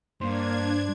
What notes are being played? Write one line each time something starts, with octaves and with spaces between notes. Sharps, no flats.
G2 A#3 D4 C5 G#6